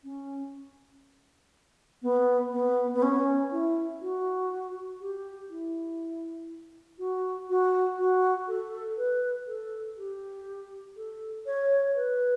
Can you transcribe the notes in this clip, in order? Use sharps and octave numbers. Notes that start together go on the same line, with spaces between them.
C#4
B3
B3
B3
C#4
E4
F#4
G4
E4
F#4
F#4
F#4
A4
B4
A4
G4
A4
C#5
B4